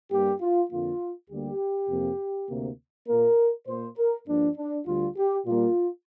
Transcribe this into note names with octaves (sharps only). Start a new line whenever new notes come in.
G2 G3 A#3 G4
F4
F2 D3 F3 A#3 F4
D2 D3 G3 A#3 G4
F2 C3 F3 A#3
D2 C3 A#3
A#2 A#3 A#4
A#2 A#3 C5
A#4
G2 F3 A#3 D4
D4
D2 D3 G3 F4
G4
A#2 G3 A#3 F4